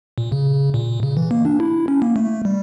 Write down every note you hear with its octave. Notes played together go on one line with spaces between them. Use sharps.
A#2
C#3
A#2
C#3
E3
A#3
D4
E4
C#4
A#3
A3
G3